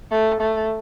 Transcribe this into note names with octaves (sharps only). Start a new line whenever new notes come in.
A3
A3